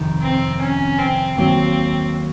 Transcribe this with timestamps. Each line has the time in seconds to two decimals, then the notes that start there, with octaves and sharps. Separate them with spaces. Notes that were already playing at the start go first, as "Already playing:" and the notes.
Already playing: F2 C3 D#3
0.22 C4
0.61 C#4
0.99 C4
1.37 D#2 D#3 F#3 A#3 C4